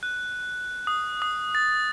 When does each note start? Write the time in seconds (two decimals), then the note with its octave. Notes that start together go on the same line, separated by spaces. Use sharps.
0.03 F#6
0.87 D#6
1.22 D#6
1.55 A6